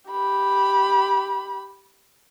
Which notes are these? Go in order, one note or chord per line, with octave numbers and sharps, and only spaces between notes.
G4 B5